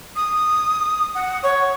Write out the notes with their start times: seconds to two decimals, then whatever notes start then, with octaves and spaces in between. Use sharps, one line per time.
0.16 D#6
1.15 F#5
1.43 C#5